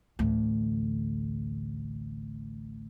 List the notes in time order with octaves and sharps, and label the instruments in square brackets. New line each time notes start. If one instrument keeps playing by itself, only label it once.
[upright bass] A1 D2